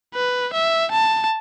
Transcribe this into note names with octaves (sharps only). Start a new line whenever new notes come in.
B4
E5
A5